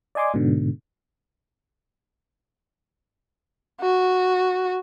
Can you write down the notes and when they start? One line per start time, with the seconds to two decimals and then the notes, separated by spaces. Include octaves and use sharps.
0.15 D5 D#5 G#5 C6 D6
0.34 G#2 B2 D3
3.81 F#4